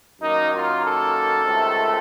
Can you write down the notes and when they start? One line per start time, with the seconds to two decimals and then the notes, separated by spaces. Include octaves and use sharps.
0.20 F#2 D#3 A#3 D#4
0.52 F4
0.83 A4
1.44 C#2 C3 D#3 A3